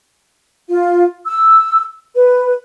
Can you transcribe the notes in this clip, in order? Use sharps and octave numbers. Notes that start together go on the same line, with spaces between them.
F4
E6
B4